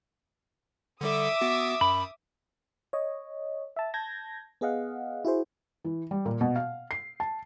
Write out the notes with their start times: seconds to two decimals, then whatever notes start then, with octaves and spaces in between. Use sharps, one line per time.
1.01 D3 G3 A4 E5 D6 D#6
1.41 B3 F#4
1.81 F#2 B5
2.93 C#5 D#5
3.76 E5 A5
3.94 A5 G6 G#6 A#6
4.61 B3 G#4 D#5 F5 F#5
5.25 E4 F#4 G#4 C5
5.84 E3
6.11 G3
6.26 A#2
6.41 B2
6.56 F5
6.91 C7
7.20 A5